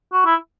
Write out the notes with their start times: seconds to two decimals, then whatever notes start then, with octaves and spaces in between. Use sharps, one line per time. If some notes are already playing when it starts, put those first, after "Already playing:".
0.13 F#4
0.25 E4